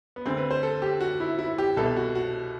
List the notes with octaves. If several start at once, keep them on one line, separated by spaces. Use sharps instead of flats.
B3
D2 D3 C4
B4
C5
A4
G4
F#4
E4
E4
G4
C2 B2 A4
F#4
F#4